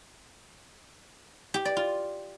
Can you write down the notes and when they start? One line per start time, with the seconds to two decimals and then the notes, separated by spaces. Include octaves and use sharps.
1.54 G4
1.65 D5
1.77 F4